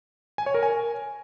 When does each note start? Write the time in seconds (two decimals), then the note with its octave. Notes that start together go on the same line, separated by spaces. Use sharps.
0.38 G#5
0.46 C#5
0.55 A#4
0.63 G#5